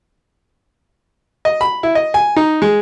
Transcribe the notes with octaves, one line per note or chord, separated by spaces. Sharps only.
D#5
B5
E4
D#5
G#5
D#4
G#3